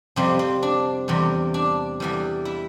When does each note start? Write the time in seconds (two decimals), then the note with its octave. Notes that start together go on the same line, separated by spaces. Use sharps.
0.16 F2 C3 G3 C4
0.39 C4
0.63 D4
1.08 E2 C3 G3
1.54 D4
2.00 E2 E3 G3
2.45 E4